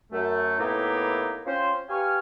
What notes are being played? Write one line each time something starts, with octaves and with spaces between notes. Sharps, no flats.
F#2 A3
A2 A#3 B3 D#4 E4 G4
C4 C#4 F4 C5
G4 B4 F5 G#5 C#6 F6